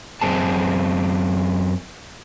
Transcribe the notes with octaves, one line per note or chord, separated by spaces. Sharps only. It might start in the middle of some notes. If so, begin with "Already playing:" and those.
F#2 C4 G#4 A5